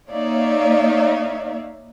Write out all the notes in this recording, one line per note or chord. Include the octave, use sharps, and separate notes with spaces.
A#3 D#4 C#5 D5 E5 F5